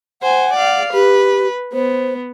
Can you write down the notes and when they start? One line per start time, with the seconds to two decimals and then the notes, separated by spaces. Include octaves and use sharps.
0.22 C5 F#5 G#5
0.54 D5 F5
0.94 G4 B4
1.73 B3 C5